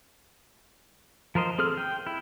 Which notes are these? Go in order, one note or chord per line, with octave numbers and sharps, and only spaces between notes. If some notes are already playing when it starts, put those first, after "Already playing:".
F3 A#4 C5 D#5
C4 G#4 A4 F6
G5
E4